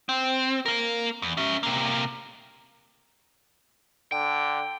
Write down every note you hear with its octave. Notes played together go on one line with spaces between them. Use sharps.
C4
A#3 A#4
E2
C#4 E5
C3 A#3
D3 G5